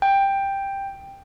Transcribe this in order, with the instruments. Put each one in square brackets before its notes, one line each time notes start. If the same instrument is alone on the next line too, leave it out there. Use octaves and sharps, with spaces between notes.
[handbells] G5